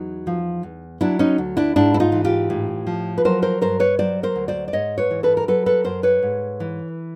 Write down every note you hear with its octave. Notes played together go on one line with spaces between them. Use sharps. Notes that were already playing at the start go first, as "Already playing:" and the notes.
Already playing: E2 F#3 D#4
F3
E2
F#3 D4 E4
C#4 D#4
D2
D4 E4
G#2 D4 E4
E4
D#4 F4
E3
F4 G4
A2
F3
B4
F#3 A#4 C5
A#4 C5
G2 A#4 C5
B4 C#5
F#3 C5 D5
A#4 C5
D2
C5 D5
D5
G#2 C#5 D#5
B4 C#5
E3
A4 B4
A#4
F#3 A4 B4
A4 B4
F#2 A#4 C5
B4 C#5
G#2
E3